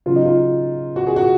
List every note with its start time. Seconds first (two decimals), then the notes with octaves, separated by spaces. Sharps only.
0.06 C#3 F#3 F4
0.16 D#4
0.25 F4
0.96 F#4
1.07 G#4
1.16 F#4